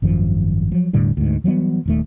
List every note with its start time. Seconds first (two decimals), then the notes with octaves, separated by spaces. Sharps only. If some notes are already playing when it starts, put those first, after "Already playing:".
0.02 G#1 F#2 D#3 F3
0.72 F3 F#3
0.93 E1 A2 D3 G3
1.17 D2 G#2
1.44 E3 F#3 G3 B3
1.85 D#1 D#2 A3